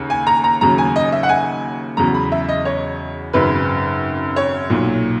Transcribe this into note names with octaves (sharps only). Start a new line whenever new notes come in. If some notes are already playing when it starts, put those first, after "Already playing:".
Already playing: D#2 C#3
G#5
A#5
A#5
D#2 C#3 F#3 A#5
G#5
D#5
E5
F#5
G#5
E2 C#3 F#3 A#5
B5
E5
D#5
C#5
G#1 F#2 C#3 B4
C#5
B1 A#2 F#3